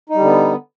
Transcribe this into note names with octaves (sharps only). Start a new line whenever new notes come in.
D3 G3 B3 D#4